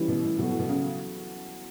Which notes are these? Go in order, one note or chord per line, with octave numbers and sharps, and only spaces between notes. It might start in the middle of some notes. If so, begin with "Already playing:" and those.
Already playing: E3 G3 C#4 E4
B2
A2
B2 F#3 B3 F#4 A4
A2
B2
C#3